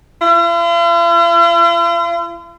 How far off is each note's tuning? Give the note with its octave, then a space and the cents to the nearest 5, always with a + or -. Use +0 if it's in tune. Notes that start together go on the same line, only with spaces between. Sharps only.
F4 -45